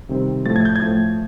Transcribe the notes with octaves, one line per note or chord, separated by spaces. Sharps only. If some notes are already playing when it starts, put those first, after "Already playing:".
C3 D#3 G3 C4
A2 F3 A3 A6
G#6
G6
G#6
A2 F3 A3